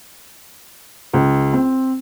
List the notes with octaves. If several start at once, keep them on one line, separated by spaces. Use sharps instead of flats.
C#2
C4